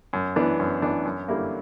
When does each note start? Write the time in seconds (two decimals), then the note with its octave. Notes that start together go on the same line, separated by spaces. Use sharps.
0.13 F#2
0.36 E3 B3 D4
0.59 F#2
0.82 E3 B3 D4
1.05 F#2
1.28 D3 G3 A#3 E4